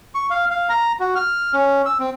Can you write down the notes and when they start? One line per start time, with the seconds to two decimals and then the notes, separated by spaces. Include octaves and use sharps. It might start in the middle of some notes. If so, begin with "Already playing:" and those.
0.15 C#6
0.30 F5
0.51 F5
0.69 A#5
1.00 F#4
1.15 F6
1.54 C#4
1.86 E6
1.99 C4